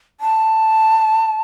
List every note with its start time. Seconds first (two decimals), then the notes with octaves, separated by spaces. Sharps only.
0.21 A5